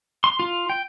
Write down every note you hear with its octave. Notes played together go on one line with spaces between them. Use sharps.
C6
F4
G5